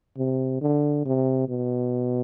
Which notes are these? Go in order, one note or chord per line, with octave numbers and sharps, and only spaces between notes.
C3
D3
C3
B2